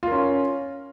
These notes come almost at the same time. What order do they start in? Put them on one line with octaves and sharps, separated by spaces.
F4 A#4 C#4